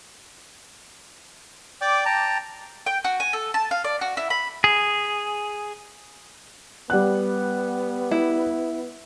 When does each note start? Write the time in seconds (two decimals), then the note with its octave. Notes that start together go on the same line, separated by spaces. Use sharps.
1.81 D5 G5 D6
2.05 G5 A5 A#5
2.86 G5
3.04 F#4
3.20 G#5
3.33 A4
3.54 A5
3.71 F5
3.84 D5
4.01 F#4
4.17 E4
4.30 B5
4.64 G#4
6.90 G3 B3 F#5 F#6
8.11 E4